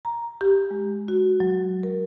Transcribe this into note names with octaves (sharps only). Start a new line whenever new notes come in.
A#5
G4
G#3
F#4
F#3
A#4